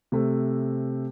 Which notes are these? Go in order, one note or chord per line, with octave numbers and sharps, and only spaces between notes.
C3 A3